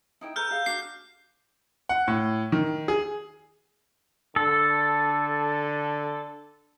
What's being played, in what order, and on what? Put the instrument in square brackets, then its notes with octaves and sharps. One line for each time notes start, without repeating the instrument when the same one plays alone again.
[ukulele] D#4 E4 G5
[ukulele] A4 B4 A#5 [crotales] F6 G6
[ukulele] G4 G#4 F5
[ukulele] D4 F#4 [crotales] C7
[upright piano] F#5
A2
D#3
G#4
[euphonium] D3 [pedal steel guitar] A4